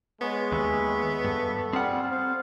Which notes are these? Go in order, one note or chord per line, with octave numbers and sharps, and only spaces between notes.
G#3 B3 G#4 C#5
D#2 E5 B5 C#6
G2 A4
G3 C4 F4 G#4 F#5
C5 F5